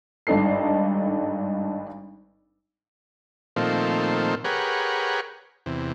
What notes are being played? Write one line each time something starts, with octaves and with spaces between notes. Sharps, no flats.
G#1 G2 D4 D#4 A4 C7
A#2 D#3 F3 A3 C4
G4 G#4 A#4 B4 C#5 F#5
E2 C3